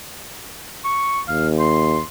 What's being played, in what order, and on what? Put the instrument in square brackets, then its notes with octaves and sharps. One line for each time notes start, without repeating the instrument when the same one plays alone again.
[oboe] C#6
[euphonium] D#2 [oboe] F5
[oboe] C6